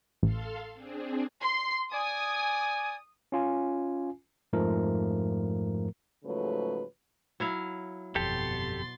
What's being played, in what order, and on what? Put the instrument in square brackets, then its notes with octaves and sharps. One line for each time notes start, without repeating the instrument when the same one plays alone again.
[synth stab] A1 [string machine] A4 F5 C6
[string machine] C4 D4 G#4
[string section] C6
[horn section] D5 G#5 [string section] D#6
[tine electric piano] C#4 F4 G#5
F2 G#2 F3 A3 A#4
[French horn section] G#2 C#3 F3 F#3 A3 B4
[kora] F#3 E4 F5
[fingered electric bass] G1 F2 [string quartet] B2 C6 A6 [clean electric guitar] G4 A4